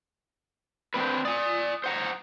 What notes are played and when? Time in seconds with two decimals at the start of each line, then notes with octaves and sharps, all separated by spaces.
0.94 C4 D4 B4 B5
1.25 D5 G#5 D#6
1.84 C5 F#5 A#5